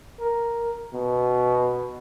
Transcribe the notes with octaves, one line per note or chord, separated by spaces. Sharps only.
A#4
B2